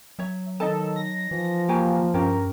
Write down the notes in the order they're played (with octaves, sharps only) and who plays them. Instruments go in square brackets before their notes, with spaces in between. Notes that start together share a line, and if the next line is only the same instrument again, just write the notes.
[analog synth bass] F#3 [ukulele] C#5 E5
[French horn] D#3 [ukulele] D#4 D#5 A5 [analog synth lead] A4
[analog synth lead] A#6
[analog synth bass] E3 [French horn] F3
[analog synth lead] A#3 [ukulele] F#4 G4 G#5
[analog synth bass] G2 [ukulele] C#4 G4 [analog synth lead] A#4